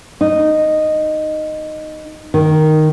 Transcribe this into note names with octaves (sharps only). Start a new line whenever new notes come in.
D#4
D#3